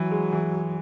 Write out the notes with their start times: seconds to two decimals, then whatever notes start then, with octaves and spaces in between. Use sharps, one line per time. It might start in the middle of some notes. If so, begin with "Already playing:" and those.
Already playing: E3 F#3
0.11 G#3
0.33 E3